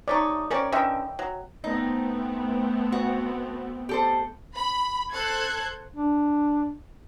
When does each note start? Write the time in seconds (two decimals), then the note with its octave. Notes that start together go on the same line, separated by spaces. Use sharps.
0.08 C3 A3 D#4 C#5 D5
0.51 C4 C#4 A#4 C#5 D5 D6
0.72 D3 E3 C#4 D#5 E5 G5
1.19 F#3
1.64 A3 B3 C4 D#4
2.92 F#4
3.89 G4 A4 C5
4.55 B5
5.13 A4 C5 F#6 G#6
5.96 D4